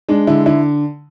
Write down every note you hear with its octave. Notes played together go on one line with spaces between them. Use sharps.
G#3 D4
D3 E4
D3 E4